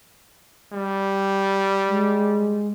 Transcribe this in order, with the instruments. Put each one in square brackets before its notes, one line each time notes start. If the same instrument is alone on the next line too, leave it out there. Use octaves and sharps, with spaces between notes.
[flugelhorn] G3
[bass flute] G#3